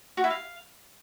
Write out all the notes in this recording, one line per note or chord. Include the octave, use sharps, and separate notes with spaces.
F#4
E4
F5